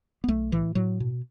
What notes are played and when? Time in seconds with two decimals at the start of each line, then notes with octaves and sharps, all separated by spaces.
0.24 B3
0.28 B1 A3
0.52 A2 E3
0.75 A2 F#3
1.00 B2